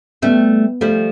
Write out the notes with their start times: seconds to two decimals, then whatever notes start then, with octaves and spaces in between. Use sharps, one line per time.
0.22 G3 A3 B3
0.81 F3 G3 A3